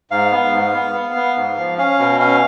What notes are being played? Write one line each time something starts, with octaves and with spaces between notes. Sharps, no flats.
G#2 F5
B3
G#2
B3
B3
B3
G#2
F3
C#4 F5
B2
C#4 F5